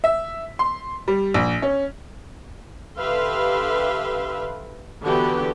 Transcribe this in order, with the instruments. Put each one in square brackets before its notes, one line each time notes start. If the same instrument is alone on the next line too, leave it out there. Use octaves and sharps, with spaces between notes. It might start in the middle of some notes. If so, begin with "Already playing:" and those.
[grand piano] E5
C6
G3
A#1
C#4
[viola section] D3 G4 B4 E5 F5 C6
D3 E3 B3 F#4 G4 B4